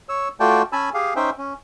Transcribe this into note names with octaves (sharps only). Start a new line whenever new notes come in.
C#5 E6
A3 F4 F#4 D5 G5 A5
C#4 G#5 A5 B5 E6
G4 G#4 F5
C#4 D#4 C5 E5 G5
C#4